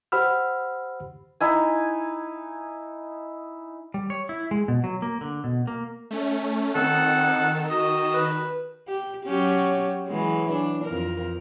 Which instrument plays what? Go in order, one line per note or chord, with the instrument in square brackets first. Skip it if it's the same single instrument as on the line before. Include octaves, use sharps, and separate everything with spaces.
[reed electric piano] G4 C5 F#5 B5 E6 F6
[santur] D#4 E4 G#5
[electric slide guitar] G3
C#5
E4
G#3
B2
F#3
A#3
D3
B2
A#3
[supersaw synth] A3 C#4
[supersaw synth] D#3 E7 [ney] C4 [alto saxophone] A4 [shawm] F#5
[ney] F#4 [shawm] D#5
[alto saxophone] B4
[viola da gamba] G4
F#3 C#4 G4
E3 F#3 G#3
D4
F2 A#4